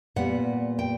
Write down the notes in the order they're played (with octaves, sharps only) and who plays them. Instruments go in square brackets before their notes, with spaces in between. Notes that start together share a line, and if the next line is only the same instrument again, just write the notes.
[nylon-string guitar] A#2 G3 B3 F#5
G5